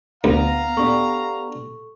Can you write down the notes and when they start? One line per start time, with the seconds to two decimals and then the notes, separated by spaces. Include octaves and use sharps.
0.24 D2 B3 F5 A#5
0.77 B3 D4 G4 A4 C#6